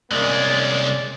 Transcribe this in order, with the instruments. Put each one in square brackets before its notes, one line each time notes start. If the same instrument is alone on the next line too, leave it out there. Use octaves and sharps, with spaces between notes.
[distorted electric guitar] C2 G#3 [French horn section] A#3 C#4 D5